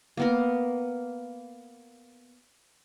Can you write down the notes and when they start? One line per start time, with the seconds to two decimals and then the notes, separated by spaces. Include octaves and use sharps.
0.17 A#3 B3 A#4